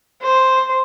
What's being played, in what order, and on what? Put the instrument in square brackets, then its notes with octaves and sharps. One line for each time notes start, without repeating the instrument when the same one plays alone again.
[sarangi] C5